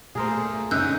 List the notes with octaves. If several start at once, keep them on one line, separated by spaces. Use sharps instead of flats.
A#2 A3 G#4 A#4 C5
F#2 D3 D#4 D#5 E6 F#6 G6